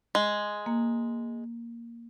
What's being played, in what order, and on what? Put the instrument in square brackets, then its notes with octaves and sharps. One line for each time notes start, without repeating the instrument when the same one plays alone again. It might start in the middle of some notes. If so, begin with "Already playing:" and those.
[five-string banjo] G#3
[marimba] A#3